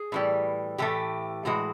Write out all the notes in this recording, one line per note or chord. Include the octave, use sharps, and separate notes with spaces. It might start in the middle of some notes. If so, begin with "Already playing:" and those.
Already playing: G#4
A2 E3 G3
A2 E3 A3 G4
A2 E3 G#3 F#4